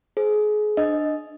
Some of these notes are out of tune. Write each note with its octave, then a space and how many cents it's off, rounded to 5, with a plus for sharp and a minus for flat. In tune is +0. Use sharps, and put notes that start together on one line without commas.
G#4 +30 C5 +0
D4 +20 D#5 +0